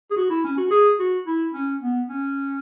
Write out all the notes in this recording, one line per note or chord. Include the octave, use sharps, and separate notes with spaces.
G#4
F#4
E4
C#4
F#4
G#4
F#4
E4
C#4
B3
C#4